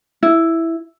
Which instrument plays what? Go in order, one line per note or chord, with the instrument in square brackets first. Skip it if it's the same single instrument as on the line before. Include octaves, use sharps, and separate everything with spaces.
[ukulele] E4